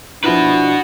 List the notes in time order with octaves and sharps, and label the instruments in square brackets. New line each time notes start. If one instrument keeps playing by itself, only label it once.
[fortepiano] F3 E4 [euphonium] D4 [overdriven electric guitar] F#4 B4